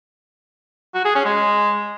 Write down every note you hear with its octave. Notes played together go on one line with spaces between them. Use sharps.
F#4
G#4
C#4
G#3